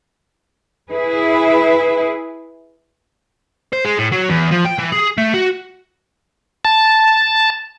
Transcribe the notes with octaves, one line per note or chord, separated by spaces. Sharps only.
E4 G#4 B4
C5
G#3
A2
F#3
E2
F3
G5
E3
G#4
A3
F#4
A5